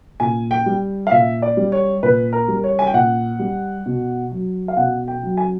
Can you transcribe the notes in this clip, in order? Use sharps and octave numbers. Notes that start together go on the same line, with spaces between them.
A#2 G#5
G5
G3
F5
A#2 E5
D5
G3
C#5
A#2 B4
A#4
G3
C#5
G#5
G5
A#2 F#5
G3
B2
F#3
F5
B2 F#5
G5
F#3
G#5